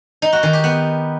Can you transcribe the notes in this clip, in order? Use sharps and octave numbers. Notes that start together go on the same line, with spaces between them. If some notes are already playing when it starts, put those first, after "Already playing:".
D#4
F#4
D#3
G4
B3